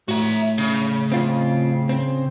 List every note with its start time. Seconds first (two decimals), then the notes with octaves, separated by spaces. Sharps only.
0.08 A2 F#4 E5
0.58 C#3
1.12 C4 F4
1.89 C4